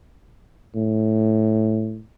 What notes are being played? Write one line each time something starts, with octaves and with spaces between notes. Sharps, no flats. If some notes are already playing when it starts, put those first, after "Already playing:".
A2